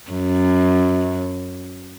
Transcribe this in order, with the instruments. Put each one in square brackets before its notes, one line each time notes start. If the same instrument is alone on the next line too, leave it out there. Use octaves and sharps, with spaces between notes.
[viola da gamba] F#2